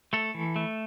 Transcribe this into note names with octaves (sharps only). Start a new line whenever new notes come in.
A3 A4
E3
A3